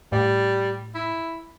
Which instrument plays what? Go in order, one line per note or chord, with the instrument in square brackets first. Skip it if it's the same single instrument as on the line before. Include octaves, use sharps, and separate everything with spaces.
[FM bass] A2 [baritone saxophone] G3
[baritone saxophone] E4